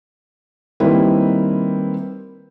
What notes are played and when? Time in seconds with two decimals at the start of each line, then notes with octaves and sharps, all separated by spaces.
0.80 D#3 G3 A#3 C4 E4 B4